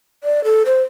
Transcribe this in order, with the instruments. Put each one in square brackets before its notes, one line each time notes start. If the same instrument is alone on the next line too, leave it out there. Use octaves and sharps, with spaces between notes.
[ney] D5
A4
C5